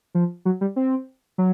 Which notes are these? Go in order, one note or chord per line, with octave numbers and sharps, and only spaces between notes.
F3
F#3
G3
C4
F#3